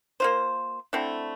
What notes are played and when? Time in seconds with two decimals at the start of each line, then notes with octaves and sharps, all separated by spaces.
0.20 A#3 F4 C5
0.93 D3 A3 C4 E4